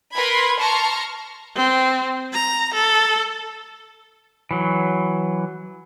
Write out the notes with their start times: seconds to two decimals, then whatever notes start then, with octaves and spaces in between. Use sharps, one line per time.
0.14 A#4 B4 B5 C6 G#6
0.58 A5 A#5 C6 C#6 F6
1.55 C4
2.34 A#5
2.74 A4
4.51 E3 F#3